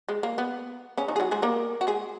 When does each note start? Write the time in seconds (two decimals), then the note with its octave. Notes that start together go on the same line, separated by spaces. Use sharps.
0.09 G#3
0.23 A#3
0.38 B3
0.98 C#3 C#4
1.08 D#3 D#4
1.16 G#4
1.20 F#3 F#4
1.31 G#3 G#4
1.42 A#3 A#4
1.81 F#4
1.87 G#3 G#4